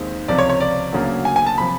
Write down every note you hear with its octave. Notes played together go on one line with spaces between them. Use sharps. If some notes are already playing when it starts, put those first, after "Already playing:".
Already playing: D#2 D#3 G#3 C4
C#2 C3 F3 D5
C#5
C#5
D5
D2 C#3 F#3 A#3 C#4
G#5
G#5
A5
C3 F3 B5